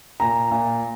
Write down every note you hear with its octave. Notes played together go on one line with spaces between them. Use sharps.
A#2 A#5
A#2